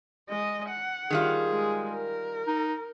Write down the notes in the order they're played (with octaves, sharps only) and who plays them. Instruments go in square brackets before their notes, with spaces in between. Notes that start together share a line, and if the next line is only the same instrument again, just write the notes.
[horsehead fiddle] G#3 D#5
F#5
[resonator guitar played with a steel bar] D#3 G3 F4 [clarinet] G#4
[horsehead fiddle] G#3
A#4
[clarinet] D#4